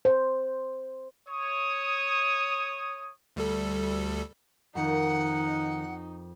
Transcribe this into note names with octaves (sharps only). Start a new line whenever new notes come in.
C5
C#5 D#6
D2 G3 A4
F2 D#3 D#4 A#4 F#5